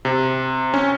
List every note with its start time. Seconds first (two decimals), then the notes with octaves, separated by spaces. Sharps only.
0.05 C3
0.74 C#4